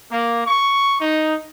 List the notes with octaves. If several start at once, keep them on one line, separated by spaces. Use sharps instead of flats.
A#3
C#6
D#4